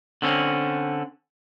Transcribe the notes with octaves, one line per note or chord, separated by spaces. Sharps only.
D3 C4 C#4